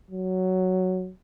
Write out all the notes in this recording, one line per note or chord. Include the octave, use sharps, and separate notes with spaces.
F#3